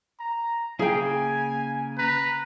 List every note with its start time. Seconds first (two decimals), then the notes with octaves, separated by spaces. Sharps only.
0.19 A#5
0.79 C#3 A#3 G#4 G5 G#5
1.98 B4 A#5